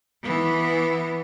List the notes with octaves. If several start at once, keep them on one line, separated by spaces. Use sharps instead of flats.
E3 B3